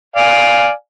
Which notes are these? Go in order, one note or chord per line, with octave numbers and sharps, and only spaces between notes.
D5 F5 G#5